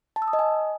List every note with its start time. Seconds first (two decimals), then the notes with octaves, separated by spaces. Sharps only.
0.16 A5
0.22 E6
0.28 D#6
0.33 D#5
0.39 G#5